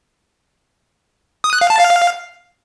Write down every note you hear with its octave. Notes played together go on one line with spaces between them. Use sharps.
D#6
F#6
F5
A5
F5